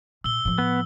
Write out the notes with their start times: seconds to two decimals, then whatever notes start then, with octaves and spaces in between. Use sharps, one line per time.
0.24 A#2 E6 G7
0.45 A2 F3
0.58 B3